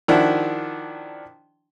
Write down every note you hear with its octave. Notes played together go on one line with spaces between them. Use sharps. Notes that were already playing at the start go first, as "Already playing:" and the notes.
D#3 F3 D4 E4 F#4